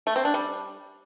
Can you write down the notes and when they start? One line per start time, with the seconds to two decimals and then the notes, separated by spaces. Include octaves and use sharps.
0.07 A3
0.16 C4
0.25 D4
0.34 G3